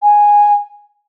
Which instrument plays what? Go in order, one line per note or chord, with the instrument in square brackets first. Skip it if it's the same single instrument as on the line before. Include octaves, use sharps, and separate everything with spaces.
[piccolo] G#5